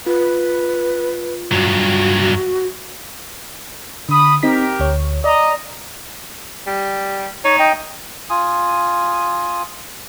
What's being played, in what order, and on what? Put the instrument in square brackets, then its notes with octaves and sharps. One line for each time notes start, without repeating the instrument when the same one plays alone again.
[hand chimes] F4 [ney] B4
[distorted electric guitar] G2 F#3 [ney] F#4
[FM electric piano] D3 [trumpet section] B5 D#6
[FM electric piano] C4 D#4 B6 [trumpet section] G4 A#4
[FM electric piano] D2 C#5
[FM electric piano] D5 [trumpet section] D#5 A#5
[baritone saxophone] G3
[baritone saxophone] D#4 [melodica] C#5
[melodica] D#5 G5
F4 G#5 D#6